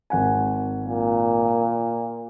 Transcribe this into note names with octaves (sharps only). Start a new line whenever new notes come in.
G#1 F#5 G#5
A#2